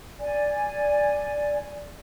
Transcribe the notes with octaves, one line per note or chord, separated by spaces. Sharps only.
D5 G#5